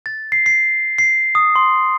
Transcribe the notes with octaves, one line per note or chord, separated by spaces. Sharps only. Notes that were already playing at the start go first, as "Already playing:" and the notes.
A6
C7
C7
C7
D#6
C6